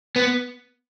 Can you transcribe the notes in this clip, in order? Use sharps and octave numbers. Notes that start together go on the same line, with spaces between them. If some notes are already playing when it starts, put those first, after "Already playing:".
B3